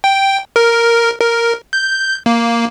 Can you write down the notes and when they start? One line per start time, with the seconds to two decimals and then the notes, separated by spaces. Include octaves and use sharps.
0.04 G5
0.56 A#4
1.21 A#4
1.73 G6
2.26 A#3